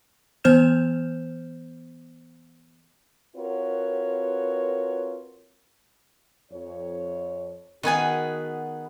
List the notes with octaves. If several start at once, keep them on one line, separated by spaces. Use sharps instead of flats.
E3 B3 C5 F6 G6 E7
C4 F4 F#4 A#4 B4 C#5
F2 C#5
D#3 B3 F#4 G#4 B4 G#5